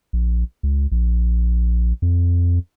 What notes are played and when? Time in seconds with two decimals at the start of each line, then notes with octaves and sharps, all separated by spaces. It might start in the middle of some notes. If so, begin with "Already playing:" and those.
0.13 A#1
0.63 C#2
0.92 A#1
2.02 F2